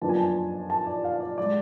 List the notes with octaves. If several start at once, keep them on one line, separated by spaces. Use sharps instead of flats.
F#1 F2 F3 B3 D4 A5
G#5
A5
A5
D5
F5
D5
G#3 D5